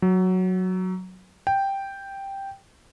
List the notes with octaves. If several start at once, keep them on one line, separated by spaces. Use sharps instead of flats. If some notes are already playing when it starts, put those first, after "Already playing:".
F#3
G5